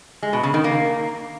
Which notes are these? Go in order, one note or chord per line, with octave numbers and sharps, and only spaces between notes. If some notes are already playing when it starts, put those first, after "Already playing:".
G#3
B2
C#3
D#3
A#3